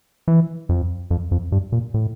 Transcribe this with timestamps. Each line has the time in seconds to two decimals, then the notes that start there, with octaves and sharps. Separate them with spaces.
0.28 E3
0.69 F2
1.10 F2
1.31 F2
1.52 G2
1.72 A#2
1.94 A2